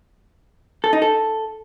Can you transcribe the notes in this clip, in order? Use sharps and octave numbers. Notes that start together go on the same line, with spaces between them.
A4
D#4
A4